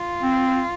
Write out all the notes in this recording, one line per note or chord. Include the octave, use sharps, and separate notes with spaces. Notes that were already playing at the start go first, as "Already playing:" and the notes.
Already playing: F4
C4